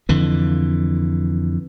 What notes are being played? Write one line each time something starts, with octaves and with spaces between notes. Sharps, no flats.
F2 D3 E3